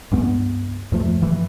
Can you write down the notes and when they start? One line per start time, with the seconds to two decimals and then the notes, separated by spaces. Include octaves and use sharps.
0.11 C#2 G2 B3
0.92 E2 G2 F3 A3
1.22 G2 E3 F3